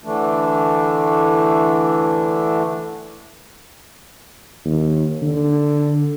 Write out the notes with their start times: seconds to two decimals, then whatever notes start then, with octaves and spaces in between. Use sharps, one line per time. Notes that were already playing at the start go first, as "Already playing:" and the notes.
0.04 D3 E3 A3 D4
4.65 D#2
5.22 D3